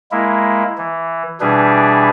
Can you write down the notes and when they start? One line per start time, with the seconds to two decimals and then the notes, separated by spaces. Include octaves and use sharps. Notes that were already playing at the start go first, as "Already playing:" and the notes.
0.12 G#3 A#3 E4
0.78 E3
1.41 B2 E3 G3 D4 G#4 B4